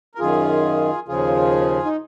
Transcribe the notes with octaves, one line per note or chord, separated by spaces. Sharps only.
A#4
F#2 D#3 F4 G#4
D#2 C#3 F3 F4 G#4
D#4